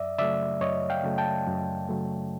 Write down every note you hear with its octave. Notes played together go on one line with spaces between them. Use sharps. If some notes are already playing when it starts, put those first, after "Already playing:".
Already playing: F#2 D5 E5
C#3 F#3 A3 D5 E5
F#2 C#5 D#5
F5 G5
C#3 F#3 A3
G5 A5
F#2
C#3 F#3 A3